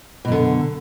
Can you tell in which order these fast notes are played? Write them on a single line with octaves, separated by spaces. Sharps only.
B2 F#2 D3